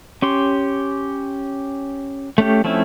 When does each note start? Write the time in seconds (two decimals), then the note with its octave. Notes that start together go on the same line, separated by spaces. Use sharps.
0.22 C#4 G4 C6
2.38 A3 C#4 G4
2.64 F3 A3 C4 C#4 E4